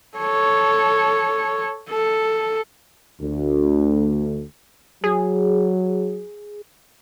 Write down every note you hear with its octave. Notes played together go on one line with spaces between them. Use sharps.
A4 C#5
A4
D2
F#3 G#4